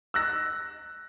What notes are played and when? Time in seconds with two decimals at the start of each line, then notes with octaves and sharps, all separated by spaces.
0.14 E6 F#6 A#6